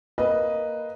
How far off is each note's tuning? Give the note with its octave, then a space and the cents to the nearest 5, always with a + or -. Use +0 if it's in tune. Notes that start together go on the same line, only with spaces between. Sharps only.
A#3 +0 B4 +0 D#5 +0